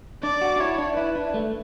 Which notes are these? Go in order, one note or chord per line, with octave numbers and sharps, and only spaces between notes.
D4 D5
F#4
D4
E4 C#5
D4
E4 B4
D4
A3